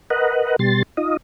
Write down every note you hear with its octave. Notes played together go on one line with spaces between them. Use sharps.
A#4 B4 D#5 F#5
B2 G3 C6 A6
D#4 F4 D#5